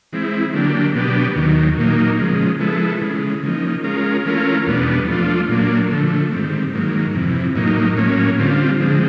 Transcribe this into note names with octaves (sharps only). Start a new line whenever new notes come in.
E3 G#3 C4 E4
D3 F#3 A#3 D4 G4
B2 F#3 B3 D4 G4
D#2 D#3 F#3
A#2 F#3 A#3 D#4
C#3 F3 G#3
F3 G#3 B3 E4 A4
C#3 E3 G#3
C#3 F3 A#3 D#4
G#3 C#4 F4 A#4
E3 A3 C#4 F4 A#4
E2 B2 G3 B3 D4
F3 A3 D4 F4
A#2 F#3 A#3 D4
D3 F3 A3
G#2 D#3 G3 C4
G#2 D#3 F#3 A#3
F2 C3 E3
A2 F#3 A#3 D#4
A2 F#3 A#3 C#4
D3 G3 C4 F4
D3 F3 G#3 C4